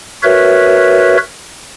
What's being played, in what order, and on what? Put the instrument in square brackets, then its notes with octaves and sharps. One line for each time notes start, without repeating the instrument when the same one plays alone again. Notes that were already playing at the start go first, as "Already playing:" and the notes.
[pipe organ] F#4 A#4 B4 C#5 E5